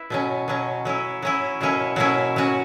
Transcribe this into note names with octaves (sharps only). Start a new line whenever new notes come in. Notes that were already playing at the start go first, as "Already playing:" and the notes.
Already playing: E4 B4
B2 F#3 C#4
B2 F#3 C#4
F#3 C#4 E4
F#3 C#4 E4
B2 F#3 A#3 C#4 E4
B2 F#3 A#3 C#4 E4
F#3 C#4 F#4